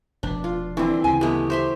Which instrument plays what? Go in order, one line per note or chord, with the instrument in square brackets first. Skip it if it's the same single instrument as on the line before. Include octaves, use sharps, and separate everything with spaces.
[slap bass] F1 B2 [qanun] D4
[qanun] F4
[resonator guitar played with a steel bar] D3 G3 [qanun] E3 [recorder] C4
[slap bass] D2 C#3 [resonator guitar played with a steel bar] G#5
[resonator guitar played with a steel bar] F#2 G#3 [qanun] A3 B3 [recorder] G4
[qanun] C5 E5 C6